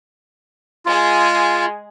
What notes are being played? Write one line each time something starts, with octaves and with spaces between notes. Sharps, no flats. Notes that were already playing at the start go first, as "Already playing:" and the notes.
G#3 F4 G#4